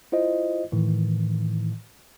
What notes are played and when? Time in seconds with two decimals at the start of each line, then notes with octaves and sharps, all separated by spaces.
0.12 E4 F4 C5 D#5
0.72 A2 D#3 E3